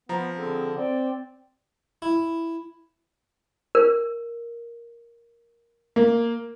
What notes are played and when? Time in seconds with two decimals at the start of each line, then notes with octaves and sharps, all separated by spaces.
0.09 F3 B3 A#5
0.35 D3 C4 G#4
0.76 C4 D5
2.02 E4
3.75 A#4
5.96 A#3